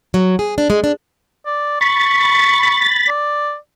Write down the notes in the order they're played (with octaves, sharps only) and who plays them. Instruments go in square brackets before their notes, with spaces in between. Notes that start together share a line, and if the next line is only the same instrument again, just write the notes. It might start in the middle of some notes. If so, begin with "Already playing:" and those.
[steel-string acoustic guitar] F#3
G#4
D4
G#3
D4
[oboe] D5
[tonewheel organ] B5 A6 [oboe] C#6
[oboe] D5